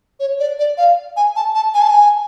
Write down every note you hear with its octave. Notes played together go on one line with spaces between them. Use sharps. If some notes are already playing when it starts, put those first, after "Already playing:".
C#5
D5
D5
F5
G#5
A5
A5
G#5
A5
G#5